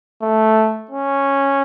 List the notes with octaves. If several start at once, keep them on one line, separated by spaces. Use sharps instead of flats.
A3
C#4